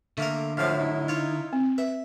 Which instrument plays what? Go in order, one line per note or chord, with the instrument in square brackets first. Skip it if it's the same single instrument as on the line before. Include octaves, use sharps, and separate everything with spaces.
[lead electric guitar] D3 [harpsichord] A3 A#3 A#4
[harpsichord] F#2 A2 [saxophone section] F3 F5
[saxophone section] D#4 E4
[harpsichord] F4 C#5
[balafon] C4
[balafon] B4 [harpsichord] E5